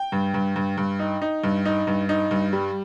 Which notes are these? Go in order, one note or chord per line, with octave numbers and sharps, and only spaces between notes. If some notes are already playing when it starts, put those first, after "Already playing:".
Already playing: G5
G2
G2
G2
G2
D#4
D#4
G2
D#4
G2
D#4
G2
G3